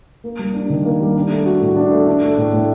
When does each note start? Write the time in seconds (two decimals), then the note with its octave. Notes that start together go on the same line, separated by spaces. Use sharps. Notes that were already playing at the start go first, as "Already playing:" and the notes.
0.24 A#3
0.39 G3
0.54 D4
0.70 D#3
0.85 A#3
1.00 G3
1.16 D4
1.31 A3
1.46 F#4
1.61 A2
1.76 D4
1.92 A3
2.07 D4
2.22 A3
2.37 A2
2.53 A2